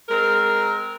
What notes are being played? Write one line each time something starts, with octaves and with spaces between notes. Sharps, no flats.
G#3 C4 A#4